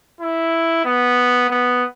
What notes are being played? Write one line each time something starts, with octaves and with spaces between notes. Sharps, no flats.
E4
B3
B3